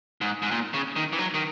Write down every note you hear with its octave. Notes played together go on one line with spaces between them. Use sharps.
G#2
G#2
A#2
C#3
D#3
E3
F#3
D#3